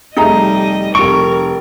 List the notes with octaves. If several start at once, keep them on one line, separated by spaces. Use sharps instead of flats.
F1 G3 A3 D#4 G#4 D#5 E5 A#5
F1 A#4 C#6 D7